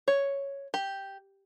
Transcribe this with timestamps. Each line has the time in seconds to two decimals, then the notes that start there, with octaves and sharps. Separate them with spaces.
0.08 C#5
0.74 G4